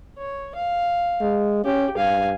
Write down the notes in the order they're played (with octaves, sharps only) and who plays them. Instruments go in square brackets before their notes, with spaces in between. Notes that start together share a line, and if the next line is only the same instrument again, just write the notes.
[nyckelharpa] C#5
F5
[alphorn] G#3
[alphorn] C#4 [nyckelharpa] G4
[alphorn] G2 [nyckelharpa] F5 G#5